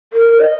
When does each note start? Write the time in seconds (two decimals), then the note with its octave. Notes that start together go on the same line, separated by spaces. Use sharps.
0.13 A#4
0.40 D#5